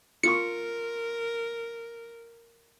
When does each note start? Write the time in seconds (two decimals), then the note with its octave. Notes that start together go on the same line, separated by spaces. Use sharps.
0.23 F4 A#4 C#6 C#7